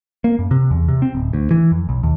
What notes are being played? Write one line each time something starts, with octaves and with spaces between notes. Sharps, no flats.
A#3
F#2
C3
E2
C3
C4
D1
D2
E3
F2
B1
D#2